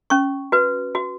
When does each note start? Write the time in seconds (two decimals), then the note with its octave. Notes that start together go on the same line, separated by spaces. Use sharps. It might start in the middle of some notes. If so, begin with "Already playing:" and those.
0.10 C#4 C#6
0.52 F#4 B4
0.95 F#4